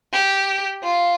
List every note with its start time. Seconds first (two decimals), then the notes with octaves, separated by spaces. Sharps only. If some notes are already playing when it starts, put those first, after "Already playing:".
0.13 G4
0.83 F4